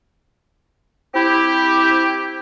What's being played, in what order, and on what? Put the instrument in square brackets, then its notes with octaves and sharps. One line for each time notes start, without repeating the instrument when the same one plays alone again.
[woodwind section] C4 E4 G4